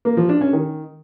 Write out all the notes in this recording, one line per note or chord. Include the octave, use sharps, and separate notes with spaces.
A#3
F3
D4
C#4
D#3